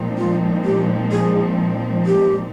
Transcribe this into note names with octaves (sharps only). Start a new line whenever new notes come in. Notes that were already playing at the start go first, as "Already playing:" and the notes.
Already playing: A#2 F3 G#3 C4 D#4
F4
G4
G#4
G4